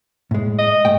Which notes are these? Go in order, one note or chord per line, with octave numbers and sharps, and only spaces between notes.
A2 G#3
D#5
G2 A3 G5